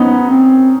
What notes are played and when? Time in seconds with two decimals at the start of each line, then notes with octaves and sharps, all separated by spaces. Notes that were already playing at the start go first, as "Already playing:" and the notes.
Already playing: B3 C#4 D#4
0.29 C4